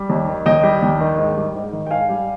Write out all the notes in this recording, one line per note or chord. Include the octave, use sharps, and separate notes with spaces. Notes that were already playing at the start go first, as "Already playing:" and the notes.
Already playing: G3
D#2
D#3
D#2 D#5 G5
G3
D#2
D#3
G#2
G3
G#2
D#3
G5
G#2 F5 G#5
G3